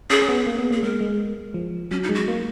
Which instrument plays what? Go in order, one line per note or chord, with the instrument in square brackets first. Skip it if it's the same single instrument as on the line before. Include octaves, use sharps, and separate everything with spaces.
[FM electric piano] C#4 [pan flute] G#4
[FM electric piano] C#4
B3
A#3
B3
[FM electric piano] A#3 [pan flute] G#4
[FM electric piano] G#3 [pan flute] A#4
[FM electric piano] G#3
F3
[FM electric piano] F#3 [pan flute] C#4
[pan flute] D#4
[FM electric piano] G#3
[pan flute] F#4
[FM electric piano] A#3